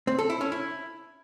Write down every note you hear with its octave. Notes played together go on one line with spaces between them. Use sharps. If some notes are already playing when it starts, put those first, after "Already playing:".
C4
A4
E4
C#4
E4